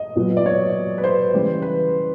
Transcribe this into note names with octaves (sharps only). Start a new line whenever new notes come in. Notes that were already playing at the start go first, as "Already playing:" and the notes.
Already playing: D#5
A#2 F#3 B3
D5
C#5
B4
C5
C#3 E3 G3
B4